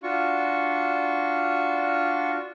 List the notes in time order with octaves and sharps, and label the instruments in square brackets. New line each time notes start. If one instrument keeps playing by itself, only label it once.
[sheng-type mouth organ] D4 F4 F#4 C#6